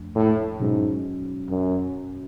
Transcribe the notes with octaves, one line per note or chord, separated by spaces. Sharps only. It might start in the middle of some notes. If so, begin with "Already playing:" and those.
Already playing: F2 F3 A3 D4
A2
G#2 B2 F#3 C#4 F#4
F#2